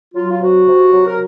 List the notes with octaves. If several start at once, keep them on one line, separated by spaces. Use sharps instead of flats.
F#3 F4
F4
C3 F#4
C3
F#3
A#4